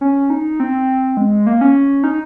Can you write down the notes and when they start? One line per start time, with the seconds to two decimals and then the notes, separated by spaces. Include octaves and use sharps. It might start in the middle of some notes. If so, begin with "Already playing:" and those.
0.01 C#4
0.30 D#4
0.60 C4
1.17 G#3
1.47 A#3
1.61 C#4
2.04 D#4